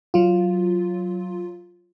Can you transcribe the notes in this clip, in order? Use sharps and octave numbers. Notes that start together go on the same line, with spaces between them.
F#3 F4